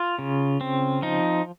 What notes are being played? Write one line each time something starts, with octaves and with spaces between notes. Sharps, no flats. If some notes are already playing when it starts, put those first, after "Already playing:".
Already playing: F4
C#3
C4
F3 D#4